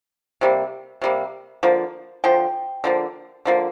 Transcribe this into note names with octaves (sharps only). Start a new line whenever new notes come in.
C3 G3 A#3
C3 G3 A#3
D3 F3 A#3
D3 F3 G5
D3 F3 A#3
D3 F3 A#3